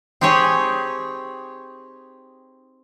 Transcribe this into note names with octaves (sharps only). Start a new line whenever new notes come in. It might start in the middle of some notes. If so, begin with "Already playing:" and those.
C4 D#4 G4 G#4 C#5